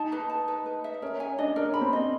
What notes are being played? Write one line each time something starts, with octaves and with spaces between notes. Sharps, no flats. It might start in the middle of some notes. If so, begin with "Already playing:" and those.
Already playing: D#4 A5
B4
A5
B4
B4
E5
C#4 A#4
C#4 G#5
D4 D#5
D4 A#4
C#4 B5
C4
C#4 D#5